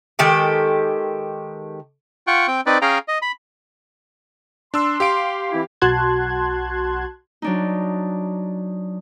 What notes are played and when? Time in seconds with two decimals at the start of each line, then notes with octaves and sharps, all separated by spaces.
0.19 D#3 G#3 G4 A4
2.27 F4 F#5 G5 C#6
2.48 C4 G5
2.66 C4 D#4 B4 D5
2.82 C#4 G#4 F5 G5 A#5
3.08 D#5
3.22 B5
4.74 D4 C6 E6
5.00 G4 F5 D7
5.52 E3 C4 E4
5.82 B1 F#4 A5 C6 F#6 G#6
7.42 F#3 D4 D#4